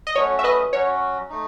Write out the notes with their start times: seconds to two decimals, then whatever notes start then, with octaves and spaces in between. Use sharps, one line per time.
0.07 D#5
0.16 F#3 A3 C#4 F#4 C#5
0.39 E5
0.44 B4 D#5
0.73 F#3 C#4 F#4 C#5
1.30 A3 D#4